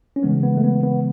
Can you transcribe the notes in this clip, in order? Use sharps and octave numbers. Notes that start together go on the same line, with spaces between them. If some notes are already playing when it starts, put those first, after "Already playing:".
C#4
C#3 E3 G#3 B3
B3
A3
B3
B3